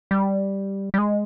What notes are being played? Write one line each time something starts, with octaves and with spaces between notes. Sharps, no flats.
G3
G3
G#3